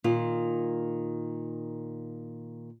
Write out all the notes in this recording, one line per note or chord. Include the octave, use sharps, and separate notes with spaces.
A#2 D#3 F4